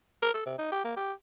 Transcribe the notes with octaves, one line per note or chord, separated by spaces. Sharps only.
A#4
A4
C3
D#4
G4
A#3
G4